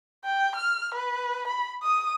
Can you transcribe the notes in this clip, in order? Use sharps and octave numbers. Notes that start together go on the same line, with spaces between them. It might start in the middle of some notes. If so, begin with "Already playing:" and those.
G5
F6
B4
B5
D#6